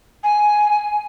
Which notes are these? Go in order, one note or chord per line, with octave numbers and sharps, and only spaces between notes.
G#5